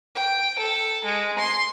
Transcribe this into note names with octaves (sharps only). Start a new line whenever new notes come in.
G5
A4
G#3
C6